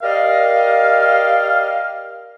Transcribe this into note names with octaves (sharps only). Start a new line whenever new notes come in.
G4 A#4 D5 D#5 F5